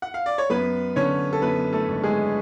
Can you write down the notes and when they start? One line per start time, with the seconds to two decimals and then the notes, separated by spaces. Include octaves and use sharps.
0.02 F#5
0.14 F5
0.26 D5
0.38 C#5
0.50 F#2 B3 B4
0.96 D3 C#4 C#5
1.33 A4
1.42 F#2 B3 B4
1.73 A3 A4
1.88 G#1
2.03 G#3 G#4